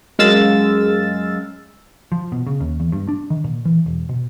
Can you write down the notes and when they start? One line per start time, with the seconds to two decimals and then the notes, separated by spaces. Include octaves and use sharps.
0.19 F#2 G#3 F5 E6 A6
2.12 F3
2.32 B2
2.47 C#3
2.60 D#2
2.80 E2
2.92 G2
3.08 D4
3.30 D#3
3.44 A#2
3.65 E3
3.86 E1
4.09 B2